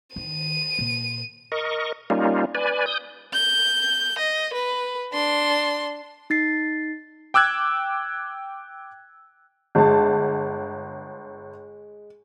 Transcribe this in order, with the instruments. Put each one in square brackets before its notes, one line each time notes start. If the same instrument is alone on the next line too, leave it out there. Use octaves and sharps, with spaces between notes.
[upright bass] D#3 [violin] D#7
[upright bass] A#2
[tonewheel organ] A#4 D#5 C#6
G3 A#3 C#4 D#4 F4
B4 D5 G#5
D#6 G6
[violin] G6
D#5
B4
D4 C6
[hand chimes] D#4 A6 C7
[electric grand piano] G5 D6 E6 F#6 G#6
[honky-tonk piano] G1 A5 [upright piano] G#3